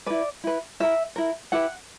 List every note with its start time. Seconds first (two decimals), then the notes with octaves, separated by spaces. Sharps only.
0.06 E4 B4 D5
0.44 E4 B4
0.80 E4 A#4 E5
1.16 E4 A#4
1.52 E4 G4 B4 F#5